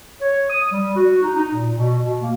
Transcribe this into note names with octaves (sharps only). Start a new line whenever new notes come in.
C#5
D#6
G3
F#4
D#4
D#4
A#2
B2
B2
A#3